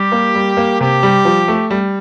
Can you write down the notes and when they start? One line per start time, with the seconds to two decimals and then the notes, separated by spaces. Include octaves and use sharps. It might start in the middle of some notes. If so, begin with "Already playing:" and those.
Already playing: G3 G4
0.12 A#3
0.35 G3
0.57 A#3
0.80 C3 G4
1.03 G3
1.25 F3
1.48 A3
1.70 G3